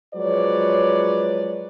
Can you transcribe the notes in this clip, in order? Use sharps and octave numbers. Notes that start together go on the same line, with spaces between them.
F3 F#3 G#3 B4 C#5 D5